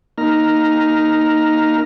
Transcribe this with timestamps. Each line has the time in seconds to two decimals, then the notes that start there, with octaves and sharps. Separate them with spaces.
0.18 A#3 D#4 A#5 F6